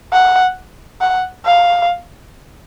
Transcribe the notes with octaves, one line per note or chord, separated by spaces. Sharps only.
F#5
F#5
F5